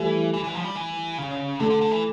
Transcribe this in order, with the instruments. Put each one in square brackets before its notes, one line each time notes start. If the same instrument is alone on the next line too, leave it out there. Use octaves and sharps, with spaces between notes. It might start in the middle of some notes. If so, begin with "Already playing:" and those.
Already playing: [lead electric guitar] E3 [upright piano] G3 A3
[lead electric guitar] E3
E3
F3
G3
E3
C#3
[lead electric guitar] D3 [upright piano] A3
[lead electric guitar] D3
D3
E3